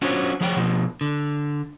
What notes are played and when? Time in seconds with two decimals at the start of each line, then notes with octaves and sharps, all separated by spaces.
0.02 C#4 D4 F4 F#4 C5 C#5
0.41 F3 G#4 C#5 F#5 G5
0.56 B2 F3
1.01 D3